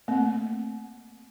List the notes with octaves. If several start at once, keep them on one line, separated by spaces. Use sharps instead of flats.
A3 A#3 C4